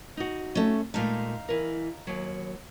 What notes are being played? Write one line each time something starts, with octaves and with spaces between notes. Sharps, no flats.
D#4 F#4
A3 C#4
A#2 G#3 A3 D#4 F5
E3 A#4
D#2 F#3